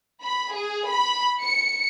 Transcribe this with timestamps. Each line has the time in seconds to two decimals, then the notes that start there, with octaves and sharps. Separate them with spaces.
0.23 B5
0.54 G#4
0.89 B5
1.43 C#7